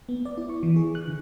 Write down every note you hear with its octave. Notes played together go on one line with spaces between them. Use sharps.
B3
D5
E4
C#6
E3
G#4
F#6
D3